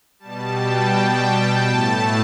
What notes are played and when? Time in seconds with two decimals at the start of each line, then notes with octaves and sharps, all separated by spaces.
0.19 B2 G3 A5
0.56 G5
1.69 A2 A3 A5